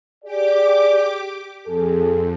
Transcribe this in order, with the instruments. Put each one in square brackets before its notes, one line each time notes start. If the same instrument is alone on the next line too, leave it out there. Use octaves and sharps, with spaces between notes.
[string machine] G4 D6 [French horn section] G#4 D5
[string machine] F2 [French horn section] G#4 A4